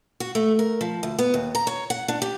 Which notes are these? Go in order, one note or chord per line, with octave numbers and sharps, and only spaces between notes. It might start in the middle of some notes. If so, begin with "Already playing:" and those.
F#4
A3
A#4
F3
D2
B3
D#2
A#5
C#5
F#5
D4
G4